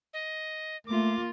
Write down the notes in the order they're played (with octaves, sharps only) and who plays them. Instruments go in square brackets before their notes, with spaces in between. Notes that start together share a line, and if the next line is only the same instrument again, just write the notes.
[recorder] D#5
[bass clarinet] A3 [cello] A#3 F4 [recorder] D6